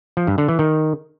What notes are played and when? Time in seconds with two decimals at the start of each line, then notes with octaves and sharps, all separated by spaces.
0.17 F3
0.27 G2
0.38 D3
0.48 E3
0.59 D#3